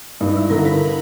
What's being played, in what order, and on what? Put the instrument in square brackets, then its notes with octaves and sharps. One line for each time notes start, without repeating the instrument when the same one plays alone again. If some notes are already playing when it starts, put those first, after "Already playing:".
[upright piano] G2 [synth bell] D#4
[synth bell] E4
[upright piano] D3 [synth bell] A#4
[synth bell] B4